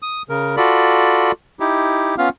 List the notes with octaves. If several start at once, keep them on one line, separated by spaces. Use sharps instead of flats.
D#6
C#3 A#4
F4 F#4 A4 D5 B5
D#4 E4 G4
B3 C#4 F4 F5 F6